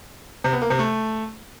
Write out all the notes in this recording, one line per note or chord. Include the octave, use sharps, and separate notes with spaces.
C3
B3
A#3
C3
A3